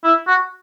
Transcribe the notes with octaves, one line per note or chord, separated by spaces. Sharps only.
E4
F#4